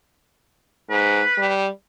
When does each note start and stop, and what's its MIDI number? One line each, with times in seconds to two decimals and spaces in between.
0.90 1.22 44
0.90 1.51 71
1.38 1.68 55